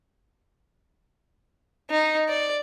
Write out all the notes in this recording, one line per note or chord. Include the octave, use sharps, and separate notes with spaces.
D#4
D5